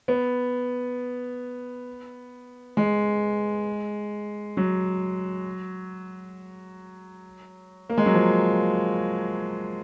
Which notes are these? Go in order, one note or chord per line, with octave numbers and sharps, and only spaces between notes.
B3
G#3
F#3
A#3
G#3
F#3
F3